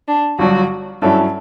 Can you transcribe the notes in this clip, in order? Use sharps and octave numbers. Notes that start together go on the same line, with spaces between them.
D4
G1 G2 F#3 F#4
G2 F#3 C#4 E4 A4